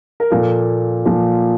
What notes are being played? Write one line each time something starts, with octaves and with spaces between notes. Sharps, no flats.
A#4
A#2 F3 A#3 A4
A#2 F3 A#3